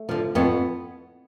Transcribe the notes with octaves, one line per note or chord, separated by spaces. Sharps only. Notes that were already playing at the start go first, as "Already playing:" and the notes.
Already playing: A3
D3 F3
F2 B3